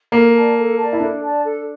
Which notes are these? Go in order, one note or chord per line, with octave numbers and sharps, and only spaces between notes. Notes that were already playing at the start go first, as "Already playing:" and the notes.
A#3 A4
D5 A5
A4
A5
D5
E4
D4 A4
D5 A5
A4